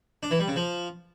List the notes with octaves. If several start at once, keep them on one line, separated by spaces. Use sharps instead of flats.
D4
E3
G3
C#3
F3